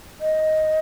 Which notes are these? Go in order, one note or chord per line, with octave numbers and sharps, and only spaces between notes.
D#5